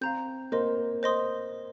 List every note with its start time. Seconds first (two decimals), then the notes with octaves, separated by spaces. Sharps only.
0.01 C4 F5 A#5 G6
0.52 A#3 C5 D#5 C6
1.03 C5 D#5 C6 D#6